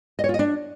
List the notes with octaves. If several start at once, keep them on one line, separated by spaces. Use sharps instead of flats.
D#5
C#5
F4
D#5
D4